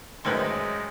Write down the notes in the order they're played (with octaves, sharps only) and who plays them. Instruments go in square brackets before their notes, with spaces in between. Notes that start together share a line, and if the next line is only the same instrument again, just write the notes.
[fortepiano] F#2 A2 D#3 [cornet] G#3 [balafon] B4 C5 C6